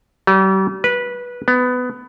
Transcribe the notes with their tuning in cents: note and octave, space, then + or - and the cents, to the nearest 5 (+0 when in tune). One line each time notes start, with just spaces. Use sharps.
G3 -40
B4 -15
B3 +20